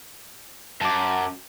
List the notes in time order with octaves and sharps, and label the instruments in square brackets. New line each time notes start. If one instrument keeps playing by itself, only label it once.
[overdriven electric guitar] F#2 [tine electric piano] A5 D6